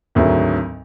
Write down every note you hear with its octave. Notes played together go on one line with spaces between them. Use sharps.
G#1 D2 G#2 D3 F#3